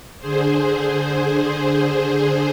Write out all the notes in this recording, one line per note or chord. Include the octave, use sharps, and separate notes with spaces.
D3 G#4 C5